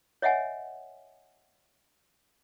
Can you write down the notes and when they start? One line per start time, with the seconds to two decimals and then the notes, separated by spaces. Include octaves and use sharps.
0.22 C#5 D#5 E5 F#5 G#5